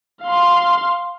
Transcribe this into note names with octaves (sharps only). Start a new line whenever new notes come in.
F5 C6